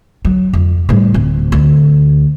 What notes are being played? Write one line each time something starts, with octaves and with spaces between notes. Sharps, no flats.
F#3
F2
A2 G3
D1
D2